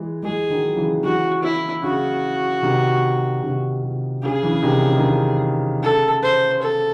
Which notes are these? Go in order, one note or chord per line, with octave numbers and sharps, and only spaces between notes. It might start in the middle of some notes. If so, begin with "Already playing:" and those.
Already playing: E3 G#3
E3 G#3 G#4
D#3 F#3
C#3 E3
C#3 E3 F#4
E4
C#3 F#4
C3 D#3
C3 D#3
C3
C#3 G#4
C#3 E3
C3 D#3
C#3
D#3
C#3
C#3 A4
C5
A4